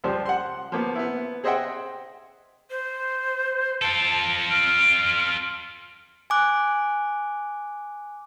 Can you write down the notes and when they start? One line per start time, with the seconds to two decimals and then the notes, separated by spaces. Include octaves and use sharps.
0.04 C#2 F3 G3 C5
0.26 F#5 C6
0.72 F3 A#3 B3
0.95 B3 E4
1.44 G#4 C5 D#5 E5 F#5 G5
2.70 C5
3.82 F4 A4 A5 D7
4.51 F6 D7
6.30 G#5 D6 F#6